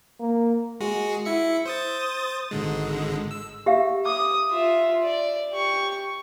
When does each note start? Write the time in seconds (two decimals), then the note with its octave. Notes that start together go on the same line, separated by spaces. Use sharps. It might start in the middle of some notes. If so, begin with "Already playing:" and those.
0.20 A#3
0.80 G#3 F#4 G#4
1.25 E4 E5 C#7
1.66 C5 D#6 A6
2.51 G#1 D3 G#3
3.31 E6
3.66 G4 E5 F5
4.06 D6 D#6
4.50 F4 E5
5.03 D5
5.53 G4 C#6